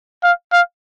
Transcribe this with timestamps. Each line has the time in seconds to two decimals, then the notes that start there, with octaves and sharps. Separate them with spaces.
0.24 F5
0.53 F5